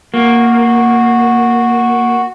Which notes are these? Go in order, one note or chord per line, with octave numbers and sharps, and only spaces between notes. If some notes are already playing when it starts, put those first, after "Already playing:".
A#3 F#4